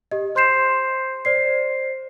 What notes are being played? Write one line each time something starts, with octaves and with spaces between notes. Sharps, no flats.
G4 D#5
C5 C6 G6 C7 E7
C5 D5 C7